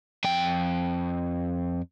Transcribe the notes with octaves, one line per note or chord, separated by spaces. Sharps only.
F2 G5